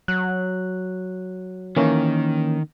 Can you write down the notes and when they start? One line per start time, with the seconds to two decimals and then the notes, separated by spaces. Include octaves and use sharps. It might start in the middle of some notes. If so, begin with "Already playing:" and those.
0.08 F#3 F#6
1.77 D#3 E3 A#3 C#4